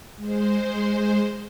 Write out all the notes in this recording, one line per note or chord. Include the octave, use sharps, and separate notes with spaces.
G#3 C5